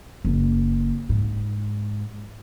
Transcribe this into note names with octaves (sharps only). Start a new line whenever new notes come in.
F#1
G#2